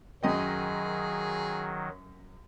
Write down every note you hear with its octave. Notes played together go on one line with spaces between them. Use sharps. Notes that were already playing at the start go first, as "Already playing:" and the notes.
F#2 D#3 F#3 G#4 D#5 G5